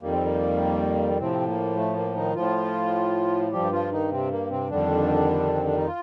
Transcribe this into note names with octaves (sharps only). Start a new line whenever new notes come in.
F2 D#3 G3 A#3
C4
A#3
A2 C3 F3 C4
A#3
A3
A#3
D#3 D#4
A2 F3 F4
G2 F3 G3 G4
F3 F4
D#3 D#4
C3 C4
A#3
C3 C4
F2 D3 D#3 G3 D4
C4
D4
D#4
F4